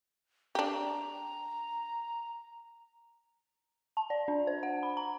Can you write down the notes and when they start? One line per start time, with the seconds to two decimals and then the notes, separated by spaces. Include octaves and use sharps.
0.55 D4 G4 A#5
3.97 A5
4.10 D5
4.28 D4
4.47 C5
4.63 F#5
4.83 B5
4.97 A#5